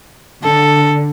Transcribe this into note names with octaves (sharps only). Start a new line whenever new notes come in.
D3 A4